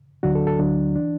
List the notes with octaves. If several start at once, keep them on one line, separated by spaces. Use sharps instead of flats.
D2 D3 F#3 D4 F#4
A4
A4
D2 D3 F#3 D4
E3 D4